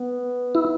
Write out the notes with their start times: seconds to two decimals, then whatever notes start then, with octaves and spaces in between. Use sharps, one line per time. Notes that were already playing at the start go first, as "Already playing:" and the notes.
Already playing: B3
0.55 E4